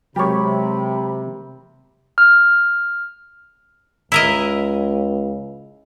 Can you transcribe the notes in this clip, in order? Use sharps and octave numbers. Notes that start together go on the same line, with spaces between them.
C3 F#3 G#3 G4 A#4 C#5 B5
F6
C#2 E4 A#4 D#5